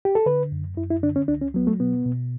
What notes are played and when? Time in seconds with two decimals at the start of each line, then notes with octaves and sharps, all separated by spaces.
0.05 G4
0.15 A4
0.26 D3 B4
0.52 F#2
0.77 F#2 E4
0.90 E4
1.03 D3 D4
1.16 C#4
1.28 C#2 D4
1.42 C#4
1.54 F#3 B3
1.67 A3
1.80 B2 B3
2.06 B2